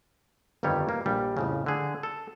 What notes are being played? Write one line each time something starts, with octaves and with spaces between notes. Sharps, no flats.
G1 F2 D#3 G3 C#5
A#3
A#1 G3
F2 A2 C#3
D3 G#4
A4